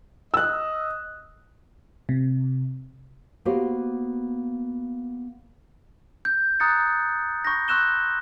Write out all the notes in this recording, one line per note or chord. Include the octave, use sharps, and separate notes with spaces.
D#5 E6 F#6
C3
A#3 B3 F#4 G4 C5
G6
A#5 D#6 F#6 A6 C#7
B5 C#6 G6 A#6
C6 C#6 E6 F#6 E7 G7